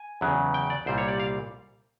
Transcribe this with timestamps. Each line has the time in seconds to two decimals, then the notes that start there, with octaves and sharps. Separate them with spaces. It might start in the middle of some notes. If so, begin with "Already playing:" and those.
Already playing: G#5
0.21 E2 C#3 F#3
0.54 G5
0.70 D5
0.86 C2 A#2 G3 C5
0.98 C#5
1.08 D5
1.20 F5